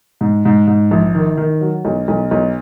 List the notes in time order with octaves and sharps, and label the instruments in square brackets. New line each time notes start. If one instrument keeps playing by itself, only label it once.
[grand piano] G#2
G#2
G#2
A#1
D#3
D#3
F#3
B1
B1
B1